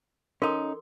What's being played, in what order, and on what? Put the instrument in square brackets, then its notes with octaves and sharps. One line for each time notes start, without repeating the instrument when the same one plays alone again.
[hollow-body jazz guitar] C#4 D#4 [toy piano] A4 A#4 C6